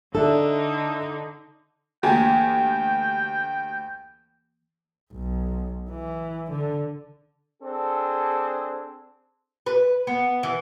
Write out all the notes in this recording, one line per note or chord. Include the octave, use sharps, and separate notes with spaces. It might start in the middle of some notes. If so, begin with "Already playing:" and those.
D3 D4 D#4 A4 E5
D2 E3 A#3 G4 G5 G#5
B1
E3
D3
C4 D4 G#4 A4
B4
B3
E3